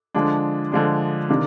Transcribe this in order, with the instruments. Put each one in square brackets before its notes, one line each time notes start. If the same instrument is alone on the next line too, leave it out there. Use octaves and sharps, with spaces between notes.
[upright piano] D3 F3 G#3 D4
D3 F3 G#3 D4
C3 D#3 A#3 D4